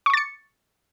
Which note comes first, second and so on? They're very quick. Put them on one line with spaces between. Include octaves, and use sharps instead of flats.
C#6 D6 A6 C#7